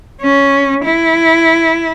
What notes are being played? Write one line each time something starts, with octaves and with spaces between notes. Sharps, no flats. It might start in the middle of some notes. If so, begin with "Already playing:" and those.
C#4
E4